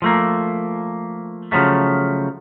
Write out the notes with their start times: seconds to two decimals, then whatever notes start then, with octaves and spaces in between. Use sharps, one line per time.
0.02 F3 A3 A#3
1.52 C#3 F3 F#3 A3